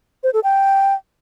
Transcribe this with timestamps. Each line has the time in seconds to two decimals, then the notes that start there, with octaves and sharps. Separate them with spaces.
0.24 C5
0.34 A4
0.44 G5